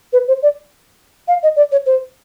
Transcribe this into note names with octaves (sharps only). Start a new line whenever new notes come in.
B4
C5
D5
F5
D#5
D5
C#5
C5